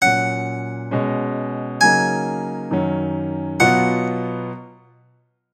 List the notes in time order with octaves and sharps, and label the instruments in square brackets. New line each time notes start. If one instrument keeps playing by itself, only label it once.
[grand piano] A#2 F#3 C#4 [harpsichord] F#5
[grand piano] B2 G#3 C#4
[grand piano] C#3 F#3 A#3 D#4 [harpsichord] G#5
[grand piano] F#2 D#3 F#3 C#4
[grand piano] B2 F#3 B3 F4 [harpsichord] F#5